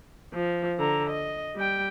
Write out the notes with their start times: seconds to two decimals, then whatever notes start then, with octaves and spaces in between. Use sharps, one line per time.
0.33 F3
0.79 D3 A#5
1.09 D#5
1.56 G3 G5